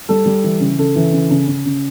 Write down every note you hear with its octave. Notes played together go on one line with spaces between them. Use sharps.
G3 A4
G3
E3
C#3
C#3 A4
E3
C#3
C#3
C#3
C#3